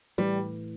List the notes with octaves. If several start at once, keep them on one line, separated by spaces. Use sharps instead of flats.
A2 E3 G3